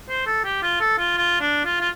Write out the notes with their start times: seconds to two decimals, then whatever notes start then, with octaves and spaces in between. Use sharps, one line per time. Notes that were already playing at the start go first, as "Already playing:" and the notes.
0.09 C5
0.27 A4
0.44 G4
0.63 F4
0.81 A4
0.99 F4
1.17 F4
1.40 D4
1.65 F4
1.80 F4